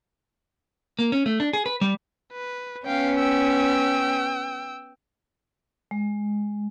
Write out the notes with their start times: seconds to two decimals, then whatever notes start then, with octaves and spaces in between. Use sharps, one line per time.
0.99 A#3
1.12 C#4
1.26 A3
1.40 D4
1.53 G#4
1.66 B4
1.81 G3
2.33 B4
2.86 B3 C#4 F5 G5
3.18 G5 E6
5.91 G#3